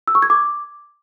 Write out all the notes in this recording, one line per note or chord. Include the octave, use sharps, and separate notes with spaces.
E6
C#6
G#6
D6